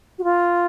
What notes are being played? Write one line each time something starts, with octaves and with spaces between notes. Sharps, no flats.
F#4
F4